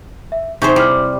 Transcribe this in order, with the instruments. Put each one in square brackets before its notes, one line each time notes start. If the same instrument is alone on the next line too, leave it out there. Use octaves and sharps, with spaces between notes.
[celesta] E5
[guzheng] C3 G#4 C5 [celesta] D#4 C#6 G6
[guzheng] G3 [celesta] E4 F6